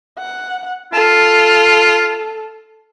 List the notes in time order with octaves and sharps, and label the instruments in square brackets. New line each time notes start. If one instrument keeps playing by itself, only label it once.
[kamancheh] F#5
[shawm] F4 [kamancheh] A4